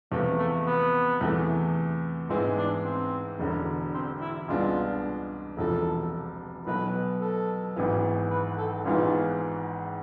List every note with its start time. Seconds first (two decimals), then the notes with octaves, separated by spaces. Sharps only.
0.12 E2 C3 F3 A3 B3 F4
0.38 A3
0.66 B3
1.21 E2 C3 E3 A3
2.29 G#2 E3 G#3 B3 C4 E4
2.57 D4
2.85 C4
3.39 E1 E2 D3
3.94 C4
4.21 E4
4.48 C2 B2 G#3 B3 D4 F4
5.57 E1 E2 C3 F3 A4
6.67 B1 B2 B3 B4
7.21 A4
7.76 G#1 G#2 E3 B3 E4
8.30 B4
8.57 A4
8.85 G#1 G#2 E3 G#3 B3 F4